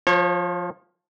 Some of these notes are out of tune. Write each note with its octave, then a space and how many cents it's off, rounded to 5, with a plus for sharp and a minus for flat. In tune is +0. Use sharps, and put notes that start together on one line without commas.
F3 +10 C#5 -35